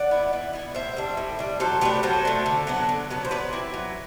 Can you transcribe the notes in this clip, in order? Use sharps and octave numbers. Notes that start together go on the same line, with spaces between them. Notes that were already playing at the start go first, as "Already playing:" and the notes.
Already playing: D5 F#5
B3 E4
E3
B3 E4
A2 C5 E5
G3 D4
A2
G3 D4
F#3 A4 C5
A3 D4 G4 B4
F#3 A4 C5
A3 D4
D3
F#3 B3 D4
D3
F#3 B3 D4
C5
F#3 B4 D5
C4 E4
F#3